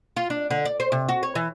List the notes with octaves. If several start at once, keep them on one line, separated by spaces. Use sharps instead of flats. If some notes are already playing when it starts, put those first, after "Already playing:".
F4
D4
D3
D5
C5
C3
F#4
C#5
E3